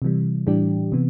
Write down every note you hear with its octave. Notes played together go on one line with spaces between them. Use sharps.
C3 E3 G3
A2 E3 G3 D4 G4
C3 E3 B3